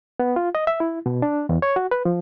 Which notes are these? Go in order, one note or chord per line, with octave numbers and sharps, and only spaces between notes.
B3
F4
D#5
E5
E4
B2
D4
E2
C#5
F#4
B4
F3